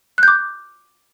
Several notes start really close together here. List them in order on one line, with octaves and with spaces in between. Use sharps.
F#6 G6 D6